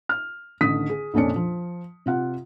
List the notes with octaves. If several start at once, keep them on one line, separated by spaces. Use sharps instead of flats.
F6
A1 D3 D#3 D#6 B6
G#4
A#1 F2 A#2 C#4 D4 C#7
F3
C3 F4 F#5